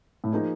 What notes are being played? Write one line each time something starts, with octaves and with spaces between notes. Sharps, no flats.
A2
F3 A#3 D#4 G#4